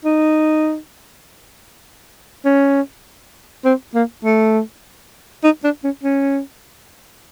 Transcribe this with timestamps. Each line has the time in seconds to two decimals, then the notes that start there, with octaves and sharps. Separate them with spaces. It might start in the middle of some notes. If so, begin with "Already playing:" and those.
0.05 D#4
2.45 C#4
3.64 C4
3.94 A#3
4.24 A3
5.44 D#4
5.64 D4
5.84 C#4
6.03 C#4